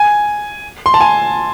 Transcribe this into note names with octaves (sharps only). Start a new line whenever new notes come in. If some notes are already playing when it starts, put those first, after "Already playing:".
Already playing: G#5
C6
A5
G#5